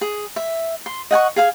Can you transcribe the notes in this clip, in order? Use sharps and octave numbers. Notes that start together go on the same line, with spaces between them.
G#4
E5
C6
D#5 F#5 G#5 C#6
G#4 F5 G#5